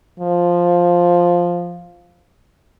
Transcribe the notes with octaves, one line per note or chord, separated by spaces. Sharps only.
F3